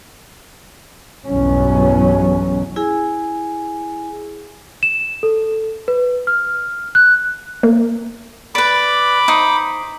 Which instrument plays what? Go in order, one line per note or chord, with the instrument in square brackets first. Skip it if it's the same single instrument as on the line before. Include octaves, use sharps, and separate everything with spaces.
[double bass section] B1 E2 G2 B2 F#3 C#4
[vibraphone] E4 G#4 G#5
[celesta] E7
A4
B4
F6
F#6
[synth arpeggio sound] A#3
[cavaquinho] B4 D5 [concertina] B5 D6
[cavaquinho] D#4 C5